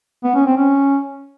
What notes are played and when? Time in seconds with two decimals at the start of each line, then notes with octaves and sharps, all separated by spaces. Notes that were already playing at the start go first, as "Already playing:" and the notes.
0.24 B3
0.35 C#4
0.46 C4
0.57 C#4